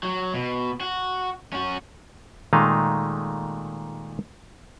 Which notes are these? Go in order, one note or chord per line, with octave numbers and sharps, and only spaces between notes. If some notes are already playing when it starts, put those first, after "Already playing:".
F#3
B2
F#4
C#4 F#4
A#2 D#3 G#3 A3 D#5 F5